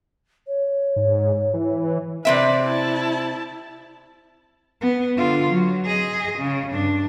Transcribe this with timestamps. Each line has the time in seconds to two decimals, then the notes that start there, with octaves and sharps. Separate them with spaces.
0.47 C#5
0.96 G#2
1.54 E3
2.25 C3 C4 B4 D5 E5
2.63 E4 A5
4.81 B3
5.17 D3 F4
5.50 F#3
5.85 G#4 D#5
6.39 C#3
6.73 G2 D4